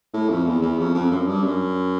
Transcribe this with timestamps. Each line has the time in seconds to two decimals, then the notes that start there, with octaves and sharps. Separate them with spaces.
0.14 A2
0.30 F2
0.46 E2
0.62 E2
0.79 F2
0.95 F2
1.11 F#2
1.27 G2
1.43 F#2